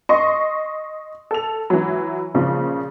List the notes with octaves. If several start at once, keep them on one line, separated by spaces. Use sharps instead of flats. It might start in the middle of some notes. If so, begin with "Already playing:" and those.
D#5 C6 C#6
A4 F7
E3 F#3
A#2 C#3 F3